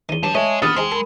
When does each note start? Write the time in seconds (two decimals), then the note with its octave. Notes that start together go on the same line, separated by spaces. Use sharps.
0.09 E2 D#3 D#7 G7
0.23 G2 F3 F#3 D6
0.35 A3 G#4 C#5 D#5 E5 A5
0.62 A#1 D#3 B3 G4 B4 D#6 F6 A6
0.76 G#3 C4 D#4 G#4 G5
0.92 A4 A#4 B5